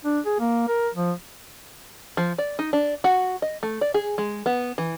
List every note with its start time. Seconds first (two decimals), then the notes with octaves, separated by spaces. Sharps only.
0.05 D4
0.26 G#4
0.40 A#3
0.68 A#4
0.95 F3
2.17 F3
2.38 D5
2.59 D#4
2.73 D4
3.04 F#4
3.42 D#5
3.63 A3
3.81 D5
3.94 G#4
4.18 G#3
4.46 B3
4.78 E3